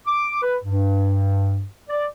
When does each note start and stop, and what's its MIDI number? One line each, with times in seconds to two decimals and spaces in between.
0.07 0.39 86
0.42 0.56 71
0.62 1.65 43
1.89 2.06 74